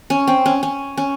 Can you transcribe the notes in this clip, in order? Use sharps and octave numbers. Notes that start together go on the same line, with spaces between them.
C#4
C4
C#4
C#4
C#4